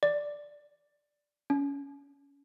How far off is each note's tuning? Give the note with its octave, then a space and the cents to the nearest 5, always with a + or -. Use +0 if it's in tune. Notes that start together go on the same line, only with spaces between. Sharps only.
D5 +0
C#4 +25